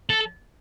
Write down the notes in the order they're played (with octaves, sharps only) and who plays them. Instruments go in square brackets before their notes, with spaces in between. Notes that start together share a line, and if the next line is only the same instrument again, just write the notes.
[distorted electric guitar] A4